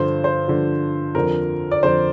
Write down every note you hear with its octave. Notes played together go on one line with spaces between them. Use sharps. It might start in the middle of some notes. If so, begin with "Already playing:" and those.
Already playing: G2 D3 F3 C5
C5
G2 D3 F3
F2 D3 F3 A#4
D5
F2 D3 F3 C5